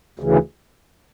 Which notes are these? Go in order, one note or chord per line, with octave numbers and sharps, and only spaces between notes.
D2 C#3 E3